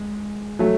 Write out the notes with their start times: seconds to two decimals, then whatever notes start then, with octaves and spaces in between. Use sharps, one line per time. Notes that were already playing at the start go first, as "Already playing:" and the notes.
Already playing: G#3
0.59 F#3 A3